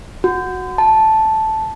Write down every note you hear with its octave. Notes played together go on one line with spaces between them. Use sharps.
F#4
A5